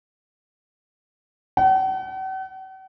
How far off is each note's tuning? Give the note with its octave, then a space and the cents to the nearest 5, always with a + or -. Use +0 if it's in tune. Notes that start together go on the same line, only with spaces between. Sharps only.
F#5 +45